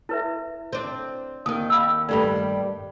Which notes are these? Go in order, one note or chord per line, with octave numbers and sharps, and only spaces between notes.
E4 B4 E5
C4 D4
D#2 D#3 D#6
F5 B5 E6
G2 G3 A3 D5 B5